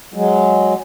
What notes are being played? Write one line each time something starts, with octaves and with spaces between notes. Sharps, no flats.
F#3 G#3